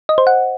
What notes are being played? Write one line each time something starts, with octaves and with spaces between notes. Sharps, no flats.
D#5
C5
F#5